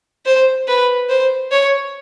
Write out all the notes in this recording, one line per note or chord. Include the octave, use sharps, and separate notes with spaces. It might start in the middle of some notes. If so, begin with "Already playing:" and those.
C5
B4
C5
C#5